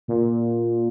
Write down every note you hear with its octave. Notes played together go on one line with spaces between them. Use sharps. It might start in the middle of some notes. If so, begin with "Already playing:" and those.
A#2